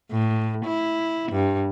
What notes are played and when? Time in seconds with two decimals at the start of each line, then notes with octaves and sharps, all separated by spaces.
0.11 A2
0.66 E4
1.32 G2